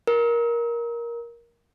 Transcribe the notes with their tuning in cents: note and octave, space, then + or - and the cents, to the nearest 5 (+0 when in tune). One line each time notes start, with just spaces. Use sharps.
A#4 +15